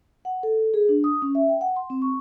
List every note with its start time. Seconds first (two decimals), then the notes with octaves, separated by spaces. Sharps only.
0.25 F#5
0.43 A4
0.74 G#4
0.89 D4
1.04 D#6
1.22 C#4
1.35 E5
1.49 G5
1.61 F#5
1.76 C6
1.90 C4
2.02 C#6